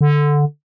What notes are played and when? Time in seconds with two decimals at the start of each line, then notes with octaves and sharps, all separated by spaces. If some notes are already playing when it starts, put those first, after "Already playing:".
0.01 D3